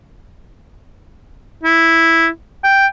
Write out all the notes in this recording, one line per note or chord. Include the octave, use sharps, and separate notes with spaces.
E4
G5